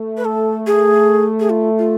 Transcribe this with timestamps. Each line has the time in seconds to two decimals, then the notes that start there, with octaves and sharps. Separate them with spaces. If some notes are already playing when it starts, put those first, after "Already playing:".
Already playing: A3
0.17 B4
0.25 A4
0.67 G#4
1.40 G#4
1.50 F4
1.78 F4